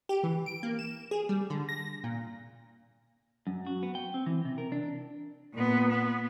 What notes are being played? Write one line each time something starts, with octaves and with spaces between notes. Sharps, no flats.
G4
E3
D7
A#3
E7
G#4
G3
D3
A#6
A#2
F#2
F#4
B3
G5
C4
E3
C3
A#4
D4
A#2 B3
B3